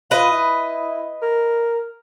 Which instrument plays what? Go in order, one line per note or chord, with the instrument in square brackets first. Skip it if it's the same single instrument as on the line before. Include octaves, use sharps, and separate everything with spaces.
[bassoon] F4 [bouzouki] B4 D#5
[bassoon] E4
A#4